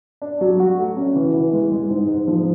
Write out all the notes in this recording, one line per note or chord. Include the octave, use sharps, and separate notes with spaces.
D4
F#3
F#4
A3
C#4
E3
E3
G#3
G#3
G#2
G#2
F3